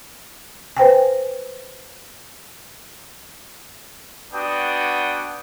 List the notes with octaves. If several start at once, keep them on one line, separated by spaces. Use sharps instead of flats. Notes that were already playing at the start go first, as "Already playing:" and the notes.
B4 C5 G5 G#5
B3 D4 F#4 G5 D#6